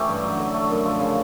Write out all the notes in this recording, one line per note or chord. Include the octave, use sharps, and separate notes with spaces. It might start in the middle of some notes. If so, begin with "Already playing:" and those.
Already playing: E3 A3 C#4 G4
G2
F#3
D3
A3
F#2
F3
C#3